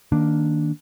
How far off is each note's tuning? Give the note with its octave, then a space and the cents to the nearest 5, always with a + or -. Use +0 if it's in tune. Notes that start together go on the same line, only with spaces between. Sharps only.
D#3 +0 A#3 +0 D4 +0